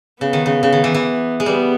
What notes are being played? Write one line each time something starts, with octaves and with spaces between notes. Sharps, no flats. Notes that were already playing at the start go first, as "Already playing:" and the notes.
C#3 B3
D#3
C#3
C#3
D#3
E3
E3
G#3
G3 B3